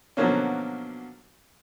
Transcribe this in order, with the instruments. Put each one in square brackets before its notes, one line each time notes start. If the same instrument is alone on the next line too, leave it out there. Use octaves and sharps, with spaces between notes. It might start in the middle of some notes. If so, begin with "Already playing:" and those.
[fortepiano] B2 D3 F3 F#3 A#3 C#4